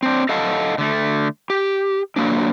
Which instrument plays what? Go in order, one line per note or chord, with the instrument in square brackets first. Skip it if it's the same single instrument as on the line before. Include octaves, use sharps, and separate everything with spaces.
[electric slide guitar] C4 D4
A4 D#5 F5 F#5 A5
D3 A3
G4
D3 F#3 A#3 D4